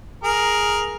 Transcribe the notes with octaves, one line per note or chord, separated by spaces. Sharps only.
G#4 A#4